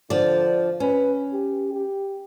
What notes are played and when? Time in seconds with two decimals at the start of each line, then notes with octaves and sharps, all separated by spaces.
0.10 D3 F3 D5
0.80 C#4 B4
1.32 G4
1.73 G4